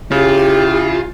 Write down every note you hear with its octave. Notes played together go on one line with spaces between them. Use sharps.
C#3 E4 F4 G4